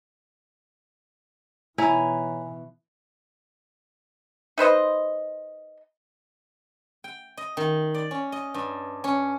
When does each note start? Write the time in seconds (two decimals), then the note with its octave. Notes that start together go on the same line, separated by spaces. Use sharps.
1.78 B2 E3 E4 C#5 G#5 A#5
4.58 D#4 B4 C5 D#5
7.04 G5
7.37 D#5
7.57 D#3
7.94 D5
8.11 C#4
8.32 D#5
8.54 G2
9.04 C#4